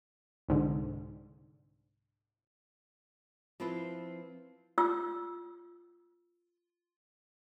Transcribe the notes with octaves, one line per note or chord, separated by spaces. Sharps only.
C2 G#2 D3
F3 C4 E4 F4 B4
F4 E6